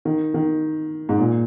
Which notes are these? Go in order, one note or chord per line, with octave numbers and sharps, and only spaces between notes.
D#3
D#3
G#2
A#2